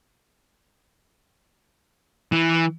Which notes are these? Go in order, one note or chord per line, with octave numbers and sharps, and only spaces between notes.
E3